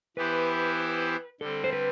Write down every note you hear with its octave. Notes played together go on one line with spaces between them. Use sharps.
E3 B3 E4 G4 B4 C5
D3 G3 C4 A4
C5
B4